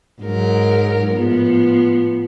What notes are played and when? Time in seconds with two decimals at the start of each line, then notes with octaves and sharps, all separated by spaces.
0.22 G#2 F#3 A#4
1.12 A2 F3 B3